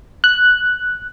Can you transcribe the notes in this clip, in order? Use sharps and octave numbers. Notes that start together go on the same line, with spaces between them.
F#6